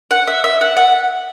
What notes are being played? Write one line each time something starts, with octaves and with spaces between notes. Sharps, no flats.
F#5
E5
E5
F#5
F#5